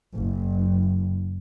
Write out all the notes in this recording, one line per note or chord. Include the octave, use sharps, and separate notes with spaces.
F#1